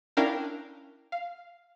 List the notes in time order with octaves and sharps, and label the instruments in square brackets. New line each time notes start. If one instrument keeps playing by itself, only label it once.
[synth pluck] C#4 D4 E4 A#4 F5 G5
F5